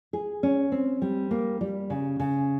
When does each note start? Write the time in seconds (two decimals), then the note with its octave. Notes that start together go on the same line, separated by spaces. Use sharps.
0.13 G#4
0.43 C#4
0.72 C4
1.02 G3
1.31 A#3
1.61 G3
1.90 C#3
2.20 C#3